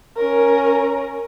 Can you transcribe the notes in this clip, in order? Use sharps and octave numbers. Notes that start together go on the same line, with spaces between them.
C#4 A#4